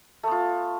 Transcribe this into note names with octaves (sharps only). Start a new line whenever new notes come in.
A3 B3 F4